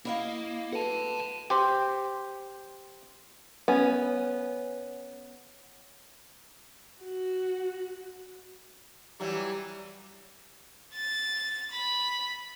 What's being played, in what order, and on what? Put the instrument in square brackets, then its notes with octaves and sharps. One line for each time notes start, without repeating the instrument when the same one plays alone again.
[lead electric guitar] A#3 [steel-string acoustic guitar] E4 D#5 F5
[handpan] F#4 A4 B4 [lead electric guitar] F#5 A5
[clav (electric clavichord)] G4 C5
[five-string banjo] B3 C#4 G#5
[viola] F#4
[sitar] E3 F#3 [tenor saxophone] G3
[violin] A6
B5